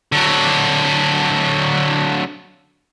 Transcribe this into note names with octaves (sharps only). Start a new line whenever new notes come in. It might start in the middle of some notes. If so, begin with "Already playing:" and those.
D3 F#3